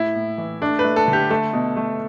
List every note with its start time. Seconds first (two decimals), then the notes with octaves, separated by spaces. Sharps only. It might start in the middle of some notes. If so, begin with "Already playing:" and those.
Already playing: A2 E4
0.15 A2
0.38 E3
0.61 A3 D4
0.79 B4
0.84 A3
0.96 A4
1.08 D3
1.13 G4
1.30 A3 A4
1.53 B2
1.77 A3